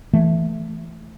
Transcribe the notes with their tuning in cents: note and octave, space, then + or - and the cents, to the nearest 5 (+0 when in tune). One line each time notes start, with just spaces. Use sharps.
E3 +10 A3 +0